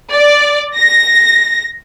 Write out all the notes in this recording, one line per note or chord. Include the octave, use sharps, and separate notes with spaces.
D5
A#6